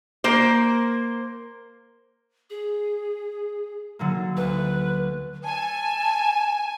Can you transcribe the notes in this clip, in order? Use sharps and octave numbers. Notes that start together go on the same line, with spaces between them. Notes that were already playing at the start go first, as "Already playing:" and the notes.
A#3 C5
G#4
D3 F#3 A#3
D2 B4
G#5 A5